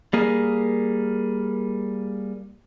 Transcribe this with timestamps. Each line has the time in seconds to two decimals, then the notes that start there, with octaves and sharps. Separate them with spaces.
0.13 G3 A#3 G#4